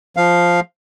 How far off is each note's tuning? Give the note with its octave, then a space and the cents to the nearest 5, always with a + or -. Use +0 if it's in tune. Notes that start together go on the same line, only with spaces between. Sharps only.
F3 +0 F5 +0